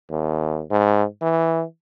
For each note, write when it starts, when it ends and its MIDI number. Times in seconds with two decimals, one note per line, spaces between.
0.10 0.62 39
0.71 1.04 44
1.22 1.64 52